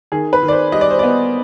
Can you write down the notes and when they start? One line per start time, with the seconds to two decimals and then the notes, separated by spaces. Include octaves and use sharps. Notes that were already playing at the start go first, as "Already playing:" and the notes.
0.12 D#3 G#4
0.33 B4
0.43 D#3
0.48 D5
0.52 C5
0.72 G3 D#5
0.81 D5
0.91 C5
0.99 B3 D5